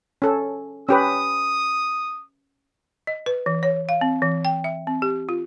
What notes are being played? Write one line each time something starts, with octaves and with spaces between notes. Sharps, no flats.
C#4 A4
C#4 G4 B4 D#6
D#5
B4
E3
C#5
F5
C4
E3
G5
E5
C4
G4
F4